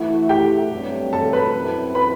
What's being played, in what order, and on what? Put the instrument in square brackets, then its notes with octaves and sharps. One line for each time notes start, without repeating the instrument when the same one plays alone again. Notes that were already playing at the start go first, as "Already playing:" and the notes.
Already playing: [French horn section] E3 A3 E4 [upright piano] F#4
[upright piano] G4 G5
[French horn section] G2 F#3 A3 C4
[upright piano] A4 A5
B4 B5
[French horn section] F#2 F#3 C4 E4
[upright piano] B4 B5